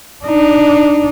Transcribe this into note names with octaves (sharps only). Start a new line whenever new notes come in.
D4 D#4